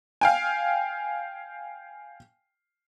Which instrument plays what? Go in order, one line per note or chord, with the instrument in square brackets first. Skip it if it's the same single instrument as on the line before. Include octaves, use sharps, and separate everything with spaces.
[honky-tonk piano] F5 G5 G#5